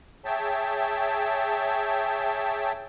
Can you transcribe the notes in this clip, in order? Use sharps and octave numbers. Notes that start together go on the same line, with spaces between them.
G#4 C#5 E5 G5 A5